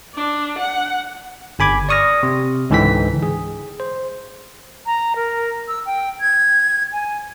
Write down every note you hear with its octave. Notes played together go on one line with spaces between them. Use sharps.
D4
F#5
G1 G#5 B5 D6 G#6
D5 C#6 D#6 F6 A#6
C3
C#2 G#2 D3 E3 G5 B6
G#4
C5
A#5
A#4
E6
G5
G#6
G#5